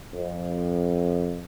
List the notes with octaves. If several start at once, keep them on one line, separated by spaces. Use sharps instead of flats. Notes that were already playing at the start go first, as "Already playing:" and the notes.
F2